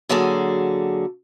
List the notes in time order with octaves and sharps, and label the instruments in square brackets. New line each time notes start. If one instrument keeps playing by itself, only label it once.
[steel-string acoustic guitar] D3 F#3 A#3 F#4 G#4 A4